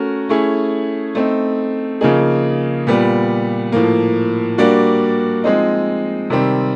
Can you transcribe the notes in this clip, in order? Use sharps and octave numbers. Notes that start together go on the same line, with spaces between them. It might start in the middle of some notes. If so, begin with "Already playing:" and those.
Already playing: A3 C#4 F#4 A#4
A3 C#4 E4 G#4
A3 C4 D#4
C#3 F3 A#3 D#4 G#4
A#2 G3 B3
A2 F3 A#3
G3 A#3 D4 F#4
F3 G#3 C4 D#4
C3 D#3 G3 C4